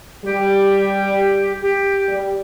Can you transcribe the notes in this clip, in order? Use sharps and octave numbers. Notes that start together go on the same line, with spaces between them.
G3 G4
G4
G3